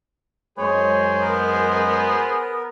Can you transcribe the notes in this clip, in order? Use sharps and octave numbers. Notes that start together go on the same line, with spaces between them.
F#2 G#3 G#4 C5 C#5
B3 A#4